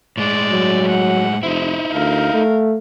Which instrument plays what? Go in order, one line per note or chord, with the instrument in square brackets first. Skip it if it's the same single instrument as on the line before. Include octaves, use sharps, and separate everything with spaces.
[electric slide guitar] A2 G#3 [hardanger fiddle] D5
[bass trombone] F#3
[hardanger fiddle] F#5
[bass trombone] F1 [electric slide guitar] D#4 E4 [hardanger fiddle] C5
[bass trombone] D2 [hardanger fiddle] A#4 F5
[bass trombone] A3